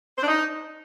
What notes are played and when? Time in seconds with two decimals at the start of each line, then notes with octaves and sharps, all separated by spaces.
0.18 C5
0.23 D4
0.28 D#4